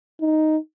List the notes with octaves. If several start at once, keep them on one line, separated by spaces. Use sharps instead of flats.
D#4